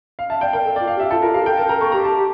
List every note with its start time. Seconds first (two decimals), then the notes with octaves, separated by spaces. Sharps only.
0.19 F5
0.30 E5 A5
0.41 D5 G5
0.53 A#4 G5
0.65 A4
0.76 F4 D5
0.87 F5
0.96 G4
1.00 E5
1.11 F4 A4
1.22 F4 A#4
1.34 G4 F5
1.46 A4 G5
1.57 A#4 A5
1.69 A#4 A#5
1.80 A4 C#6
1.92 G4 A#5
2.04 A5